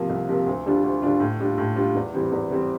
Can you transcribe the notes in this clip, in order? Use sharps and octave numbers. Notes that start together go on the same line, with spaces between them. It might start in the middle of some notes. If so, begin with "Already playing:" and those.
Already playing: C3 F3 A#3
C2
C3 F3 A#3
D2
D3 G3 D4 F4
D2
D3 G3 D4 F4
A2
G3 D4 F4
A2
G3 D4 F4
E2
E3 G3 C4
E2
E3 G3 C4